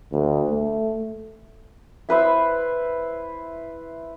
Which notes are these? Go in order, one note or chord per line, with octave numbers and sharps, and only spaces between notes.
D2
A3
E4 B4 C5 E5